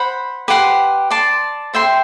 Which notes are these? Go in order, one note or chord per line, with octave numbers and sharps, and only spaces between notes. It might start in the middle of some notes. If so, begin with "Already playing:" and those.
Already playing: C5 F#5 B5
G4 B4 F#5 C6
D5 A5 C6
C5 E5 G5 C6